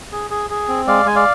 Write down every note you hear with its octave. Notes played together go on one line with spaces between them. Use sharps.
G#4
G#4
G#4
C4
G#3 D5 F5
G#3 G#5
D5 F5